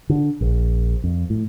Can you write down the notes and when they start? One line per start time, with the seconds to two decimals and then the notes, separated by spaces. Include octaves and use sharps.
0.09 D3
0.41 A#1
1.04 F2
1.30 A2